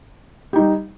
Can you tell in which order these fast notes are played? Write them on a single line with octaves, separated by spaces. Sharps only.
G4 D#4 G3